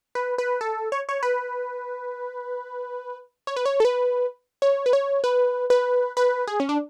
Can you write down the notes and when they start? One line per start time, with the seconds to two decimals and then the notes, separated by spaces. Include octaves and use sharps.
0.15 B4
0.38 B4
0.61 A4
0.92 C#5
1.09 C#5
1.23 B4
3.47 C#5
3.56 B4
3.66 C#5
3.80 A4
3.85 B4
4.62 C#5
4.86 B4
4.93 C#5
5.24 B4
5.70 B4
6.17 B4
6.47 G#4
6.60 C#4
6.69 D4